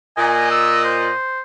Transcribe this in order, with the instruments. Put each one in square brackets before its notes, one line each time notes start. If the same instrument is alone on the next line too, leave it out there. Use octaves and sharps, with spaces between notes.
[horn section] A#2 D#5 [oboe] G#5
[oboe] E6
C5